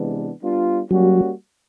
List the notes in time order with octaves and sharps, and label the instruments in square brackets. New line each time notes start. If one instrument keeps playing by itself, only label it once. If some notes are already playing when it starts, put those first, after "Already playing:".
Already playing: [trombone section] C3 E3 G#3 B3 D4
G3 B3 D4 F4
[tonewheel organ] F#3 [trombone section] G3 A#3 C#4 F#4